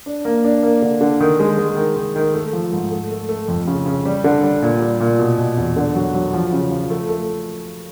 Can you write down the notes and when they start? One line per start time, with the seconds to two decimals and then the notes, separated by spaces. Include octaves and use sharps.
0.06 D4
0.25 A#3
0.44 D4
0.63 A#3
0.82 D3
1.01 D3
1.20 D#3
1.39 G#3
1.58 G#3
1.76 D#3
1.96 D#3
2.16 D#3
2.34 A3
2.53 F3
2.72 G#2
2.91 A3
3.11 A3
3.29 A3
3.48 F2
3.68 C#3
3.86 C#3
4.06 G3
4.24 D3
4.43 G3
4.62 A#2
4.81 G3
5.00 A#2
5.19 B2
5.38 B2
5.57 E2
5.76 D3
5.95 F#3
6.15 F#3
6.34 F3
6.53 C#3
6.71 F3
6.90 A3
7.09 A3